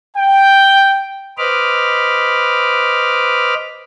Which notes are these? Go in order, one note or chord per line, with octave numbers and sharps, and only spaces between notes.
G5
B4 C5 D#5 B5 D6 F6